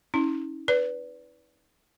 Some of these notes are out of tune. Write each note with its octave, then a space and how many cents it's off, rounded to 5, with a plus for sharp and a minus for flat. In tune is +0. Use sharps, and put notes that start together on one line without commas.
C#4 +0 E4 -45
B4 +0 D5 -25